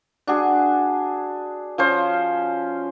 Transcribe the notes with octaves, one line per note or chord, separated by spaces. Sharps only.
D4 F#4 G#4
F3 C#4 C5